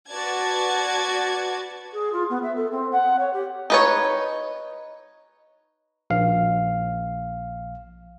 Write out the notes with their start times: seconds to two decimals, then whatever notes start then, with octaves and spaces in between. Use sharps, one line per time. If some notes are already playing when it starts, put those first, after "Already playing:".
0.10 F#4 B4 D5 A5 G#6
1.93 G#4
2.12 F4
2.29 B3
2.42 E5
2.55 A4
2.71 C4
2.92 F#5
3.19 C#5
3.33 G4
3.70 D#4 B4 C#5
6.10 A#1 F5